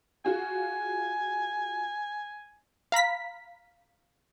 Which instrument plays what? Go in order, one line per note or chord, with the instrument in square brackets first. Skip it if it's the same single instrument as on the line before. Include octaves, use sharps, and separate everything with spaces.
[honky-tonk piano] F4 F#4 G#4 [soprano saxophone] G#5
[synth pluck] F5 A#5 B5 B6